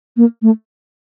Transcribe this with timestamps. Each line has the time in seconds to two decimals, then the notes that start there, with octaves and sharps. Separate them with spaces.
0.17 A#3
0.42 A3